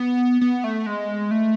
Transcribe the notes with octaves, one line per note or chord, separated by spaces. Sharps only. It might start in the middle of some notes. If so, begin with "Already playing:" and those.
Already playing: B3
B3
A3
G#3
A3